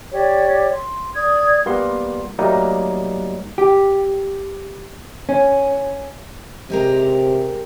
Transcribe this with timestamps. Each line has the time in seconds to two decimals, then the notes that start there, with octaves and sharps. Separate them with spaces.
0.12 G4 C#5 D5
0.73 C6
1.15 D5 D#6 G#6
1.66 G3 A#3 B3 F4 C6
2.39 F#3 G3 A3 A#3 D#4
3.58 G4
5.29 C#4
6.70 C3 G#3 G4 A#4